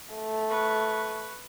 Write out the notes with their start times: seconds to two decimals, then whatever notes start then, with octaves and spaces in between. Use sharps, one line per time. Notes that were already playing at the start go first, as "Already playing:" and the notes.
0.15 A3
0.48 B4 C#6